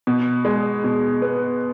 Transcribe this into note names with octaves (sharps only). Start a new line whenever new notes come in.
B2
G#3
B2
B3